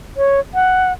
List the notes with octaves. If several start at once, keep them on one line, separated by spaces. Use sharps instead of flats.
C#5
F#5